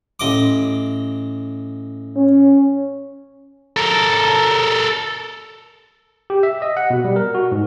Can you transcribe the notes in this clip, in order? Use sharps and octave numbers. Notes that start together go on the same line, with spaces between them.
A1 D#5 D6
C#4
A4 A#4
G4
E5
D#5
F#5
B2
G3
A#4
F#4
G#2